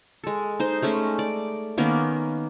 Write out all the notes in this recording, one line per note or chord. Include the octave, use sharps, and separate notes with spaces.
G#3 A4
D#4 C5
G#3 A3 C#4
D5
D#3 A#3 B3 C#4